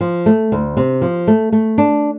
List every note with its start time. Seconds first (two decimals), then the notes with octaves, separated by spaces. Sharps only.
0.01 F3
0.26 A3
0.52 D2
0.77 C3
1.01 F3
1.27 A3
1.52 A3
1.78 D4